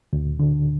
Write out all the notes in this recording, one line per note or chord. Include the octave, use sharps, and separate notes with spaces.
D2
D3